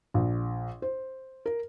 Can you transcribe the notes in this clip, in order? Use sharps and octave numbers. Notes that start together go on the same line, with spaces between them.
A#1
C5
A#4